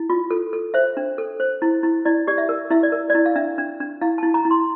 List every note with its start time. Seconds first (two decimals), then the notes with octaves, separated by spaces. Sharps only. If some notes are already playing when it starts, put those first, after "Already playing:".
Already playing: E4
0.10 F4
0.31 A4
0.53 A4
0.74 C5 E5
0.97 D4
1.18 A4
1.40 C5
1.62 E4
1.83 E4
2.05 E4 D5
2.27 G4 D5
2.38 E5
2.49 A#4
2.70 E4 E5
2.83 D5
2.92 A#4
3.10 E4 D5
3.26 F5
3.36 D4 E5
3.58 D4
3.80 D4
4.01 E4 F5
4.18 E4 A5
4.34 A#5
4.45 E4
4.51 C6